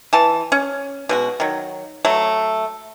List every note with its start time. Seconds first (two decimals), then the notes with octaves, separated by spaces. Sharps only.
0.13 E3 A5
0.52 C#4
1.09 B2 G#3 F#4
1.40 D#3 F#3
2.05 F#3 A3